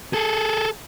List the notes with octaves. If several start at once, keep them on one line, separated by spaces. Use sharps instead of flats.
G#4 A4